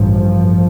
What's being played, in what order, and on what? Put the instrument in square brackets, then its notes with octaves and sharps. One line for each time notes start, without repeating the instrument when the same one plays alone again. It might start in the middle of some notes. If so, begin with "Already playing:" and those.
Already playing: [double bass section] A1 G2 F3